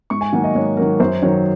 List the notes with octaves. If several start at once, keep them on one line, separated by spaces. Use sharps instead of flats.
G#2 C#6
G#5
D#3 F#3 A#3 F#5
D#5
G#2 C#5
D#3 F#3 A#3 A#4
F#2 C5
D#3 F#3 C#5